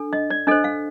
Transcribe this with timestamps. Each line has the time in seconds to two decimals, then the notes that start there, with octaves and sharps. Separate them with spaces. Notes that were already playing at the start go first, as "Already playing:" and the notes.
Already playing: D4 A4
0.13 D#5
0.30 D5
0.47 D4 A4 C5 D#5
0.64 F5